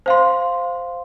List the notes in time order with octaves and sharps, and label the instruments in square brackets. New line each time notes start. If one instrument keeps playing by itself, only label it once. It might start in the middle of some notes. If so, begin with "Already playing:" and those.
[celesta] C5 F5 C6